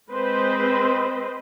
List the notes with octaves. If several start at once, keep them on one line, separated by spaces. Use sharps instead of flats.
G#3 C4 B4 C5 D#5